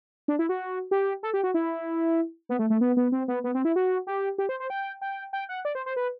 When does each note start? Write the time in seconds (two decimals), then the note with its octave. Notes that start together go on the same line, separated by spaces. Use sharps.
0.28 D4
0.39 E4
0.49 F#4
0.91 G4
1.23 A4
1.34 G4
1.44 F#4
1.54 E4
2.49 B3
2.59 A3
2.70 A3
2.81 B3
2.97 B3
3.12 C4
3.28 B3
3.44 B3
3.54 C4
3.65 E4
3.76 F#4
4.07 G4
4.38 G4
4.49 C5
4.60 C5
4.70 G5
5.02 G5
5.33 G5
5.49 F#5
5.65 D5
5.75 C5
5.86 C5
5.96 B4